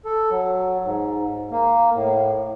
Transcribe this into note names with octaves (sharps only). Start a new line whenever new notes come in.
A4
F#3
G#2
A#3
A2